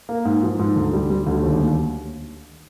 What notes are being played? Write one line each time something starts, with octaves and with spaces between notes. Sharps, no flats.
A#3
G#2
F3
G#2
D2
G3
G3
D2
D#2
D#2